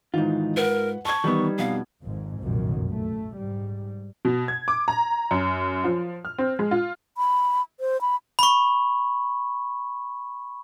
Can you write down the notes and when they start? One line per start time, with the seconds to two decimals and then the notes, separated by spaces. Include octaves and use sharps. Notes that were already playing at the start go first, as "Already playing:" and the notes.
0.14 G#2 D#3 E3 D#4 F4
0.57 A#4 B4 F#5
1.05 A5 C#6 G#6
1.24 D#3 E3 G3 B3 D#4
1.58 F2 B2 F5
2.04 G#1 F2 G#2
2.42 F1 B1 F#2 A#2 D#3
2.91 A3
3.36 G#2 G3
4.25 B2
4.48 G#6
4.68 D6
4.88 A#5
5.31 F#2
5.84 F3
6.25 F6
6.38 C4
6.59 G#3
6.71 F4
7.17 B5
7.80 C5
8.01 B5
8.39 B5 C#6